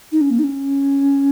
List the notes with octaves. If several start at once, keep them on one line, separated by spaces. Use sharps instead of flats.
D#4
C#4
A#3
D#4
C#4